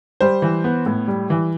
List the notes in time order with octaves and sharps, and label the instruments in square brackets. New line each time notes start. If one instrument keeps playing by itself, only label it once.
[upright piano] G3 C5
E3
B3
A2
G3
E3